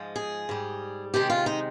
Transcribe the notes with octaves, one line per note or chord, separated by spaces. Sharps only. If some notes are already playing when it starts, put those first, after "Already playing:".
Already playing: G#2 F3 G#3
G#4
G#2 G3
C3 D#3 G#3 G4
F4
D#4